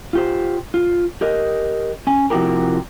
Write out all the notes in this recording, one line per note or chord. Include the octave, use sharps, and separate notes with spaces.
F4 G4 C5
F4
G4 A#4 D#5
C#4 G#5
C3 F3 E4 F#4 G4 A#4